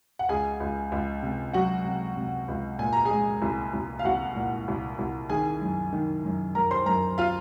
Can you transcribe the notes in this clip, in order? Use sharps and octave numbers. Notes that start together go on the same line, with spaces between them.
F#5
C#2 G#4 G#5
C#2
C#2
C3
F#3 F#4 F#5
C3
C3
C#2
A#2 G#5
A#5
G#4 G#5
G#3
C2
C2
F5
C2 F#4 F#5
A#2
C2
C2
D#3 G#4 G#5
F#2
D#3
F#2
F#2 A#4 A#5
C5 C6
F#2 A#4 A#5
F4 F5